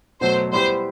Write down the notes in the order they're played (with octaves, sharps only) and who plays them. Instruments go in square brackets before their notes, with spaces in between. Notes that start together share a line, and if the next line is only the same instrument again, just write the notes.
[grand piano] B2 F#3 A3 [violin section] C5
[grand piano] G3 B3 E4 G4 [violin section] C5